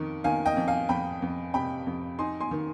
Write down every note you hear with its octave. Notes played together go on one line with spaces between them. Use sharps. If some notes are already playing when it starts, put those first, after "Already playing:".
Already playing: F2 D#3
D#3 F5 G#5
D#5 G5
F2
F5 G#5
F2 G5 B5
F2
C3 G5 B5
F2
D#4 G#5 C6
G#5 C6
D#3